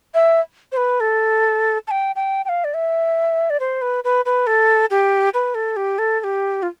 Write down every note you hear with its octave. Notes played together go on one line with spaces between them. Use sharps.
E5
C5
B4
A4
A5
G5
G5
G5
F5
D5
E5
D5
C5
B4
B4
B4
A4
G4
B4
A4
G4
A4
A4
G4
F4